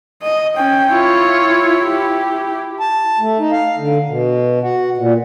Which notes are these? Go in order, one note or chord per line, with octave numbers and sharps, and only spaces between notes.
D#5
C#4 G5
E4 F4 C#5
G4
A5
A3
D#4
F5
D3
B2
F#4
A#2